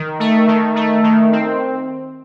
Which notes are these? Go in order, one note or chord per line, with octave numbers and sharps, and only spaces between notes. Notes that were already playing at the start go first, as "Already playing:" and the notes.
Already playing: D#3
A3
D#3
A3
D#3
C4